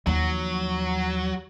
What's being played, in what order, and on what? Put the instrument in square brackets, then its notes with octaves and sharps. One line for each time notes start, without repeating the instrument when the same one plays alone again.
[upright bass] D#2 F3 [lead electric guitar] F#3